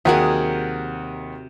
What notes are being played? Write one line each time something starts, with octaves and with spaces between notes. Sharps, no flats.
D#2 C3 F#3 G#4 A#4 F#5